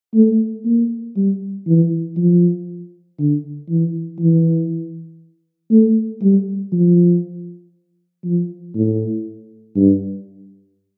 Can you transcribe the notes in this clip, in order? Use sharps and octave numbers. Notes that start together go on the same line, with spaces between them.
A3
A#3
G3
E3
F3
D3
E3
E3
A3
G3
F3
F3
A2
G2